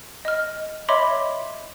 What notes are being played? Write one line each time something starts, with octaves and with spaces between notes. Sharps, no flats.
D#5 F6
C#5 D#5 E5 B5 C6 D6